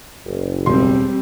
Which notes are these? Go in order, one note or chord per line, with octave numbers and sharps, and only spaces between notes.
F#1
E1 B1 G3 C4 C6